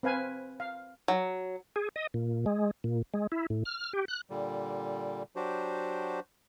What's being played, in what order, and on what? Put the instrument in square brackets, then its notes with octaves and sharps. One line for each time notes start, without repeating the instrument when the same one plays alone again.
[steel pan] C4 B4 F5 G#5
F5
[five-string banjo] F#3
[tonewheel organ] G#4
D#5
A#2
G#3
A#2
G#3
E4
A2
F6
G4
F#6
[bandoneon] A#2 D3 G3
F#3 D4 F#4 G4 C5